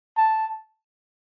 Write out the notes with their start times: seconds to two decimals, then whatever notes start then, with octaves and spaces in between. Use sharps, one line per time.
0.17 A5